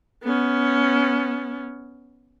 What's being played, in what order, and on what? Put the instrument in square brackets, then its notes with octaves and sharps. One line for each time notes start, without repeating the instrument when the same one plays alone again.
[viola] B3 C#4